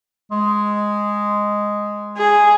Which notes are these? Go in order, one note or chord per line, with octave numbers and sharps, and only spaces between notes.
G#3
G#4